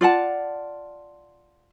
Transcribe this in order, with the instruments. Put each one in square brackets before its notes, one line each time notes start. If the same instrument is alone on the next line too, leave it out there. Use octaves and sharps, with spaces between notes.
[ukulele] F4 D5 F#5 A5